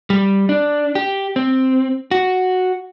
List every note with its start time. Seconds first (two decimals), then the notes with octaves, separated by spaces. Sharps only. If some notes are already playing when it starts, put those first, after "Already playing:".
0.10 G3
0.49 D4
0.95 G4
1.36 C4
2.11 F#4